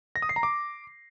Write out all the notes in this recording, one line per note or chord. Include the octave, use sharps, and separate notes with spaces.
A#6
D#6
C7
A#5
D6